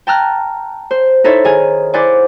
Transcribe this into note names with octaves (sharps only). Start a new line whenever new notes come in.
G5 A5 A#5 F6 F#6
C5
D#4 E4 A4 C5 C#5 E5
D#3 G#4 G#5 F6
E4 C5 D5 F#5 G#5 D6